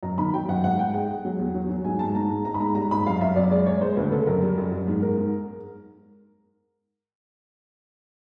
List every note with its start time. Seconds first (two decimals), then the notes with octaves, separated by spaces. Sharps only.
0.03 F#2 A#5
0.18 D#3 B5
0.34 F#3 G5
0.48 F#2 F#5
0.64 G#2 F#5
0.79 G#2 G5
0.94 G#3 F#5
1.09 G#3
1.25 F#3
1.39 E2
1.54 F#3
1.69 F#3
1.84 G#2 G#5
1.99 G#2 A5
2.15 G#2 A#5
2.30 G#2
2.45 G#2 A#5
2.54 B5
2.60 G#2 A#5
2.75 G3 A#5
2.91 G#2 B5
3.06 F#2 F5
3.21 F#2 E5
3.36 F#2 D5
3.51 G#3 D5
3.66 G#3 C#5
3.81 G#3 C5
3.97 D2 B4
4.12 C#3 A4
4.26 F#2 A#4
4.42 G3
4.58 F#2
4.72 F#2
4.87 G#2
5.02 G#2 A#4
5.17 G#2